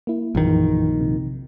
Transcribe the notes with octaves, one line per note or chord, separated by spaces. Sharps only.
A#3 E4
A#1 F#2 D#3 E3
C3